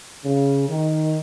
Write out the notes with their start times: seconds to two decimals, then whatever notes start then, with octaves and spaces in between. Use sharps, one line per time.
0.24 C#3
0.69 D#3